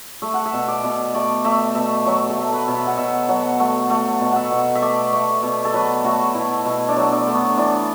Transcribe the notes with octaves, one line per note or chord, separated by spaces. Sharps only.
A3 E5
F#5
E5
B2
D5
B2
A3 D5
A3 E5
B2 E5
F#3 E5
A4
A3
B4
B2
E5
F#5
B2 E5
F#3 F#5
A3 F#5
A3 F#5
B2
E5 F#5
B2
E5
A3 D5
A3
B2
A4
F#3 B4
A3 F#4
B2 E4
B2 E4
D4
F#3
D4
A3
B3
E3 D4